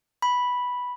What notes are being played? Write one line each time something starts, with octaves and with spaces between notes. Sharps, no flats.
B5